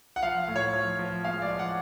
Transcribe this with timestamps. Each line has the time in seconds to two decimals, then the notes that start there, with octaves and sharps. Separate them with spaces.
0.16 F#5
0.22 F3 F5
0.48 A2
0.56 C#5
0.73 F3
0.99 F3
1.24 G#3 F5
1.42 D5
1.50 F3
1.59 F#5